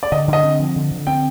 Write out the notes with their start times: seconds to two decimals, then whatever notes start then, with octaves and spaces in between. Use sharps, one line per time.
0.03 D5
0.12 D3 D#5
0.28 D3
0.33 D#5
0.43 C4
0.60 F3
0.76 D3
0.91 D3
1.07 C4 G5